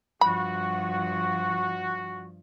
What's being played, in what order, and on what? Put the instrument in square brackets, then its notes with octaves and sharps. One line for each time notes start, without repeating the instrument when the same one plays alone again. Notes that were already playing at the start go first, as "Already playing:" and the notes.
[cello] G2 F3 [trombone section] F#4 [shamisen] B5